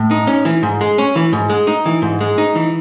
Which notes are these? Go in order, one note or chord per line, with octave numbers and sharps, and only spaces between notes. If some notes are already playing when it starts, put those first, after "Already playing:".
Already playing: A2
D#4
C#4
E3
G#2
G#3
C#4
E3
G#2
G#3
D#4
E3
G#2
G#3
D#4
E3